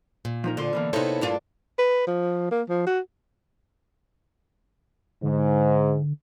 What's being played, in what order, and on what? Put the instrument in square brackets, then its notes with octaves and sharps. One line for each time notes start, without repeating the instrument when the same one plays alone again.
[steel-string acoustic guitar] A#2
[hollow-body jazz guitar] F3 D#4 A#4
[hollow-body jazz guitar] D2 F4 C6 [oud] D3
[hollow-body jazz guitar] B2 E3 A#3
[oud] C3 C#5 [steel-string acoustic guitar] A#3 E4 A4 [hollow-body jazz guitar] B3 D#4 C5
[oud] G2 D4 F4
[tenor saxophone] B4
F3
A#3
F3
F#4
[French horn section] G#2 [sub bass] D3